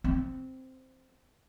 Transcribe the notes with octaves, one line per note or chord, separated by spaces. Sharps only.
C4